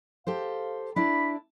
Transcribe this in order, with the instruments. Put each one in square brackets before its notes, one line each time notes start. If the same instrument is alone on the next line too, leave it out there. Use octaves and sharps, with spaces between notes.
[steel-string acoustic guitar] G4 A4 C5 [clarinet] F5
[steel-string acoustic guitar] D4 E4 D5 [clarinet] B5